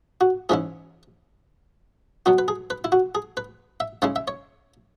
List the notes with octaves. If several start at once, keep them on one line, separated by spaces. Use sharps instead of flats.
F#4
G#2 E3 C#4 E4 G#4
B2 F#3 B3 F#4
B4
G#4
B4
E4
F#4
G#4
B4
E5
C#3 G#3 C#4 E4 C#5
E5
C#5